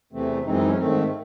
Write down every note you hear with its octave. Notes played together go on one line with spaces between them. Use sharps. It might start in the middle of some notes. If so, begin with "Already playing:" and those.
E2 C3 E3 A3 C4
F#2 E3 G#3 C4 D#4
D#4
C#4
G#2 D#3 A3 C4